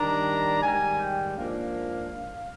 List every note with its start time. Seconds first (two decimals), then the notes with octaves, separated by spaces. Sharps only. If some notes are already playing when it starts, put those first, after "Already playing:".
Already playing: D#3 G3 D4 A#5
0.62 G#2 D#3 G3 G#5
0.99 G5
1.36 G#2 F3 A#3 D4 F5